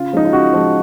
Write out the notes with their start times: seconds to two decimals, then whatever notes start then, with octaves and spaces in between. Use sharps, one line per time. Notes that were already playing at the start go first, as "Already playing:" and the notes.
Already playing: C#3 F4
0.13 F3 G#3 D#4
0.25 F4
0.33 C#3 F#4
0.53 F3 G#3